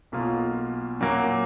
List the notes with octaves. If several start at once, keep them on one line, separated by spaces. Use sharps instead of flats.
B1 B2 A#3 F4
A#2 F#3 A#3